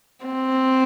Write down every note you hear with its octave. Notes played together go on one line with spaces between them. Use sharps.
C4